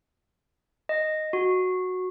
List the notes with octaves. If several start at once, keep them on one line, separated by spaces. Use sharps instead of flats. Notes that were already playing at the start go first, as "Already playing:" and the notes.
D#5
F#4